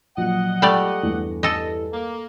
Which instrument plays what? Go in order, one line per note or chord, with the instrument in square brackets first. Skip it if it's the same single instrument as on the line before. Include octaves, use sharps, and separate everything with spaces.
[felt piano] A#1 F#3 [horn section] D#5 F#5
[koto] G3 A3 D5
[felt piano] E2 G2
[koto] A4 D#5
[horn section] A#3